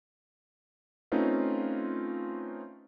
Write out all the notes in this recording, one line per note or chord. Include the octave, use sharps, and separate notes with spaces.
A3 C4 C#4 D#4 F4 B4